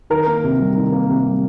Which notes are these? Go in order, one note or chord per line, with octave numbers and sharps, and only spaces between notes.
D#3 A#4
A#3
C3
G3
D#3
A#3
C3
G3